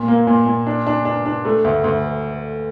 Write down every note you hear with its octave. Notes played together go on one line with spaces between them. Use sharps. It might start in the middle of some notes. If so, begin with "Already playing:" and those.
Already playing: A#2
A#3
A#2
A#2
D4
D4
D4
D4
A3
D2
D2